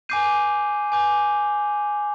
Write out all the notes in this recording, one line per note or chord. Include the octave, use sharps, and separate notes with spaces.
G#5 D6 G6 C7 D#7
G#5 D6 G6